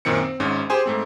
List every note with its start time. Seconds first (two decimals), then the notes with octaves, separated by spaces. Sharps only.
0.05 F#2 A#2 D#3 C4 C#7
0.21 C4
0.40 G#1 G#2 C#4
0.70 G4 G#4 C5 G#5
0.86 G#2 A3 C4